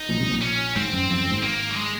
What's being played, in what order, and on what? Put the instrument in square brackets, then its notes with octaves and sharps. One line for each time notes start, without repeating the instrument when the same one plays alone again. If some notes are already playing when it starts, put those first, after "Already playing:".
Already playing: [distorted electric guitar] D#4
[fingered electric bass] A#1 A#2
C2 C3
A#1 A#2
[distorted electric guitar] C#4
[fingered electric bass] G#1 G#2 [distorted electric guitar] C4
[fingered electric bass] F#2
F2
F#2
G#1 G#2
[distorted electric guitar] A#3
F#3
G#3